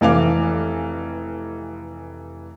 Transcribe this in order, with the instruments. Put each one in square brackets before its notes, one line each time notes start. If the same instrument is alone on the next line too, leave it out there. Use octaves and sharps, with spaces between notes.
[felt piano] F1 E3 F5 D6